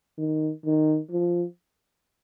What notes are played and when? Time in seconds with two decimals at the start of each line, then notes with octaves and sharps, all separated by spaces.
0.18 D#3
0.65 D#3
1.11 F3